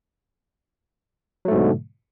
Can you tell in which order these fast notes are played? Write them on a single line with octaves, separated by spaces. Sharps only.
F#3 A3 G#2 B2 D3